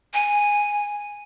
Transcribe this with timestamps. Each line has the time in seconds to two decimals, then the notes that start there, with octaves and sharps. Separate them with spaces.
0.14 G#5